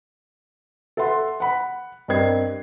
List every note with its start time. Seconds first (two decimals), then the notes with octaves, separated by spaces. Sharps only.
0.97 A4 E5 F#5 C6
1.40 F#5 B5
2.08 G2 C4 A#4 D#5 G#6 C7